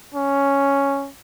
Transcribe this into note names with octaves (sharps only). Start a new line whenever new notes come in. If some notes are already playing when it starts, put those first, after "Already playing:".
C#4